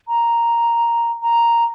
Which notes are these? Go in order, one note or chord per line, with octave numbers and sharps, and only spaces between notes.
A#5
A#5